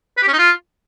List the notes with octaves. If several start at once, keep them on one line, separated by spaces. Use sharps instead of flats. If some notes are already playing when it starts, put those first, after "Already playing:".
B4
G4
C#4
D#4
F4